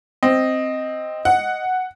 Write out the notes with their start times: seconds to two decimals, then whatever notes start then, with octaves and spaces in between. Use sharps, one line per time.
0.23 C4 D#5
1.25 F#5